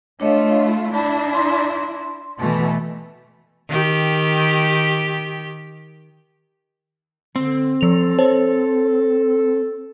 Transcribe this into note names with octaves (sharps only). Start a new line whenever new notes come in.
A3 D4 F4 C#5 D#5
D4 E4 A5 B5
C6
B2 E3 A3
D#3 G4
D3 C4
F3 A4 F7
C5 C#5 A5